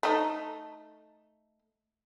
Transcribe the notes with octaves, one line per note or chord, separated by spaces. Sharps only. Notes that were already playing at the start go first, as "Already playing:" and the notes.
A3 D#4